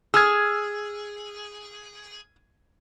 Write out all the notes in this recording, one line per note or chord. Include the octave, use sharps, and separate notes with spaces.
G#4 E6 F6 G#6